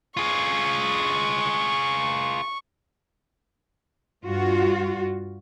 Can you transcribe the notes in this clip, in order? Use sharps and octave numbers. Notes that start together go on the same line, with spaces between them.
F4 G#4 C#6
G2 F4 F#4